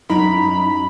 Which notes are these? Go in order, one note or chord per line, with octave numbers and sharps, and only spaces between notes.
F#2 D#4 A#5 B5